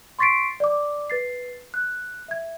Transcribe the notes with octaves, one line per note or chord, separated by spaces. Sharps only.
C6 C#6 A6 B6 C7 D7
D5 D6
B4 A6 C7
F#6
E5 G#6